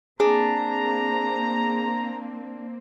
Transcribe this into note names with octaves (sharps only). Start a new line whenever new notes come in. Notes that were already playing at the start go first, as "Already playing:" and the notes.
A#3 C4 D4 G#4 A#5